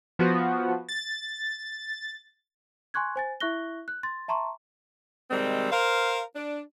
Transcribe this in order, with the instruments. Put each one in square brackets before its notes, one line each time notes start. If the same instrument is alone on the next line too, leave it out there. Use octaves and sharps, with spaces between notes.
[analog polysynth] F3 B3 F#4
A6
[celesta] G#5 C6 C#6 F#6 G#6
C5 G#5 A6
E4 E5 C#6 F#6 A#6 G7
F#6
C6 A6
E5 A5 A#5 C6 C#6
[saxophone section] C3 D#3 G3 G#3 C4
A#4 C5 F5
D4